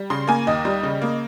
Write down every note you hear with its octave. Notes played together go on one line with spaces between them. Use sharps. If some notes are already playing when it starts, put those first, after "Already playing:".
Already playing: G3
C#3 C6
A#3 G#5
D#2 D#5
G3
C#3
A#3